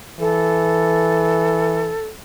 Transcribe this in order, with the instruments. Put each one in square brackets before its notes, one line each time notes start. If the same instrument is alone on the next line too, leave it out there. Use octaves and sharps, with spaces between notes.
[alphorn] E3 [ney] A4